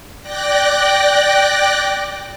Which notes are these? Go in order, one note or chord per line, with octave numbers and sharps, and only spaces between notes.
D5 G5 F#6 A#6